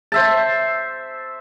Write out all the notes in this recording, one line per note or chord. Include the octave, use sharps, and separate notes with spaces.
C5 E5 A5